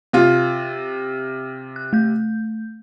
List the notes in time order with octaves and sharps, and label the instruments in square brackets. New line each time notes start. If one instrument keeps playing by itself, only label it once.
[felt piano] C3 F4
[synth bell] F#6
A3 G6